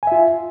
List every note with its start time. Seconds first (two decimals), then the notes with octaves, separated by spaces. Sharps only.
0.03 G#5
0.07 E5
0.12 F4